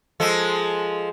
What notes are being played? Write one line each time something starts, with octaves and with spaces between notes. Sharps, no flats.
F3 G#3 A4